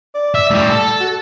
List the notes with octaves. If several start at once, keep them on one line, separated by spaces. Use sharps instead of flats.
D5
E5
A2 G3
A4
F#4